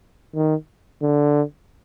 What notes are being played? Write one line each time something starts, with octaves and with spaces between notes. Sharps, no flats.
D#3
D3